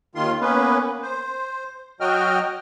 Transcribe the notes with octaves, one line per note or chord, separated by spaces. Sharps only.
D#2 D#3 F4 C6
A#3 B3 C#4 B4
C5
F#3 F#4 D#5 G5 F6